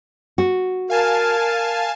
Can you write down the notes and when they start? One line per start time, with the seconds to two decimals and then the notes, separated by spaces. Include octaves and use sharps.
0.38 F#4
0.90 A#4 F5 G#5 A5